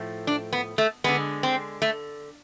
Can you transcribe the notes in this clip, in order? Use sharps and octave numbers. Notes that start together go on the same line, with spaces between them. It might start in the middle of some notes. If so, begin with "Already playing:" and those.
Already playing: A2 F3 A3
D4
B3
A3
D3 G#3 B3
C4
A3